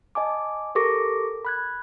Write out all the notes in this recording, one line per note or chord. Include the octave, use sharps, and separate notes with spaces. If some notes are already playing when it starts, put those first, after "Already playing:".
D#5 G#5 A5 D6
G4 A4 A#4 C#6 D6 A#6
B5 F#6 G#6